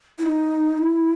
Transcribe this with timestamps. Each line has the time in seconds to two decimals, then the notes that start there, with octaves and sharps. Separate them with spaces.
0.18 E4
0.23 D#4
0.78 E4